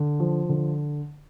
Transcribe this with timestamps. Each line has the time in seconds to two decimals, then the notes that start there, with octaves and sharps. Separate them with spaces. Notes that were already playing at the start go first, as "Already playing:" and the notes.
Already playing: D3
0.20 F3
0.49 D3